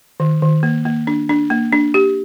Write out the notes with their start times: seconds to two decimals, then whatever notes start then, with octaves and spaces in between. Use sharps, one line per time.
0.20 D#3
0.42 D#3
0.63 A#3
0.85 A#3
1.07 D4
1.29 D4
1.50 A#3
1.72 D4
1.94 G4